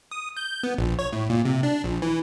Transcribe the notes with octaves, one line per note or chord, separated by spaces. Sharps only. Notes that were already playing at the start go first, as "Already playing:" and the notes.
D#6
G6
B3
A#1
C#5
A2
A#2
C3
D4
A#1
E3